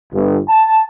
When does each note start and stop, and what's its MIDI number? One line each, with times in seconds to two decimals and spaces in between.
0.13 0.38 31
0.49 0.85 81